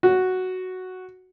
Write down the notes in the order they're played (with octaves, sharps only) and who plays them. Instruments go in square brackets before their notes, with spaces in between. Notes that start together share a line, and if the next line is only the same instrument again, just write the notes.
[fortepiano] F#4